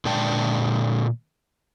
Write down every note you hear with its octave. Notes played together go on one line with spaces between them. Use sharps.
A#2 D3 G#3 D5 G5 A5